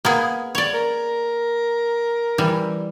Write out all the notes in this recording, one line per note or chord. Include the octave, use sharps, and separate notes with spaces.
A#3 B3 G#4
C#5 D5
A#4
E3 G3